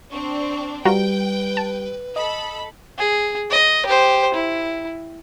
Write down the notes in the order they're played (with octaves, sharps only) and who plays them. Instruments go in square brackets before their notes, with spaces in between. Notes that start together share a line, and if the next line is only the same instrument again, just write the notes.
[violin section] C4 D4 [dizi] C#6
[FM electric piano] G3 [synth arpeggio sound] F4 F#4 A#5 [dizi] B4 [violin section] G5
[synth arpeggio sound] A5
[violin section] A4 B5 [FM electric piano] D#5
[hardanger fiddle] G#4
D#5
G4 C5
E4